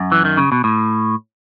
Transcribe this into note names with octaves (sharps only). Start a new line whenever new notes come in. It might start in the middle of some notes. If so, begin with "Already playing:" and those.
Already playing: F#2
E3
D#3
C#3
B2
A2